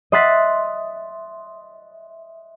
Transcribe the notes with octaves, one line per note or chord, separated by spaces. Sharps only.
D#5 E5 C6 F#6 A6 B6